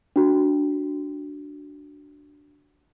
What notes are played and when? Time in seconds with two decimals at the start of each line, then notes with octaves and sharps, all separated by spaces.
0.16 D4 F#4